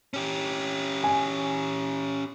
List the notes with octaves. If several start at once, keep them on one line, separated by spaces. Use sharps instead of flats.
C#4 G4
G#5